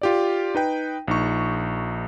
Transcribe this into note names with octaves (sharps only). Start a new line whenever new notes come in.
F4 G4 D5
D#4 B4 G5
A#1 D#4 C#6